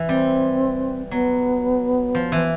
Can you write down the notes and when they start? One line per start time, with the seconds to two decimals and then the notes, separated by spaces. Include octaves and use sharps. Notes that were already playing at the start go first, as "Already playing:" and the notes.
Already playing: E3
0.09 G3 C4
1.11 F#3 B3
2.15 F3
2.32 E3